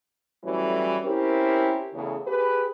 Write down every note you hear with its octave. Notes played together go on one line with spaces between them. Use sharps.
A2 E3 F#3 G3 C#4
C4 C#4 E4 G4 A#4
E2 A2 C#3
G4 G#4 B4